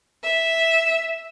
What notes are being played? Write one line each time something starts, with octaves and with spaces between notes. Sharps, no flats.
E5